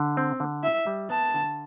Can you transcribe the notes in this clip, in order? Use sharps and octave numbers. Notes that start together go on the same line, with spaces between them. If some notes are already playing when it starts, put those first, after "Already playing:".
Already playing: D3
C4
D3
E4 E5
G3
B3 A5
D3